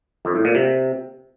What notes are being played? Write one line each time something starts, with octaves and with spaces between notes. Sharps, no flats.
F2
A2
A#2
C3